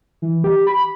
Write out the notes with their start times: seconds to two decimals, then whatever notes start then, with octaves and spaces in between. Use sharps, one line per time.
0.22 E3
0.44 G4
0.67 B5